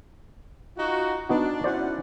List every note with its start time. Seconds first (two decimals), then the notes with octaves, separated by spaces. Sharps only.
0.77 D#4 F4 F#4
1.29 B3 D4 D#4 F#4
1.64 C#4 E4 F#4 C5 D5 F#5